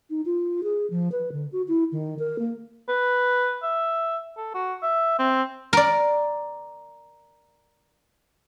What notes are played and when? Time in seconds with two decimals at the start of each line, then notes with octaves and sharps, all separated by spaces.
0.10 D#4
0.25 F4
0.63 G#4
0.90 F3
1.12 B4
1.32 D3
1.52 F#4
1.68 E4
1.92 D#3
2.19 A#4
2.39 A#3
2.88 B4
3.63 E5
4.37 A4
4.54 F#4
4.83 E5
5.19 C4
5.73 A#4 D5